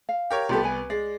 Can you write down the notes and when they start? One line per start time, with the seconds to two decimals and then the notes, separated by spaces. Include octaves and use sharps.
0.09 F5
0.30 G4 A#4 C#5
0.49 C2 B3 F4 G4 A4
0.64 B4 G#5
0.90 G#3 D5